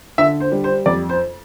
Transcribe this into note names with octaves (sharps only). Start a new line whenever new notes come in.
D3 E5
C5
G3
C5
F2 D5
C5